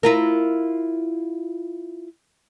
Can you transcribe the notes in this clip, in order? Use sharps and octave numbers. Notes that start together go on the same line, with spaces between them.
E4 F4 A#4